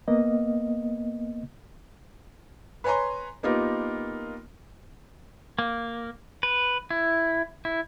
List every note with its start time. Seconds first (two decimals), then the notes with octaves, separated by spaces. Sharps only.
0.08 A#3 B3 D#5
2.84 B4 C#5 G#5 A#5 C6
3.43 A#3 B3 D#4 F4 G4 A#4
5.59 A#3
6.43 B4
6.90 E4
7.65 E4